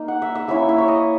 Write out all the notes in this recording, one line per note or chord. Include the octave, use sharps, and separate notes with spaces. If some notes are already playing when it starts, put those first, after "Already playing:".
Already playing: A#3 D#4
F#5
E5
E5
A#3 C#4 E4 E5
E5
C#5
D#5